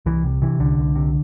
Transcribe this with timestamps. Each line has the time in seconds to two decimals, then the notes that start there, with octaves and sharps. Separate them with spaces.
0.06 C2 E3
0.24 C3
0.42 C3 E3
0.59 C2 D3
0.78 C2
0.96 C3